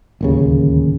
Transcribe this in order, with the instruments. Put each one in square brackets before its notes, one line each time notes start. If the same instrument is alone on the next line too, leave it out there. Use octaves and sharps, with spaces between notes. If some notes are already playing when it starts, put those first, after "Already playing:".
[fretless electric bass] D1 D#2 C#3